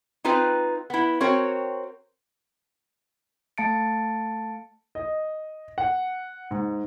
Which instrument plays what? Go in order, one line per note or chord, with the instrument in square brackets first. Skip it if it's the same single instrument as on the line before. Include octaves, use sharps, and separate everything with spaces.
[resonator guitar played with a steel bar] C4 D#4 F4 B4
B3 E4
C4 F#4 A#4 C#5
[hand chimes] A3 F5 A5 A6 C#7 D7
[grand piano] D#5
F#5
G#2